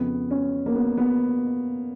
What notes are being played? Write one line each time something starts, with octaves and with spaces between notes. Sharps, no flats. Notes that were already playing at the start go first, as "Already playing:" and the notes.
Already playing: F2 C#3 F3 B3
C#4
A#3
B3
B3